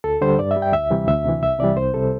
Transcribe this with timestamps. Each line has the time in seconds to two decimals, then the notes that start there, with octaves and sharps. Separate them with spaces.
0.04 D2 A4
0.21 D3 G3 C5
0.39 G2 D5
0.51 E5
0.56 G3
0.62 G5
0.73 D2 E5
0.91 C3 E3 G3
1.08 D2 E5
1.25 C3 E3
1.43 C2 E5
1.59 C3 E3 G3 D5
1.77 C2 C5
1.94 C3 G3 A4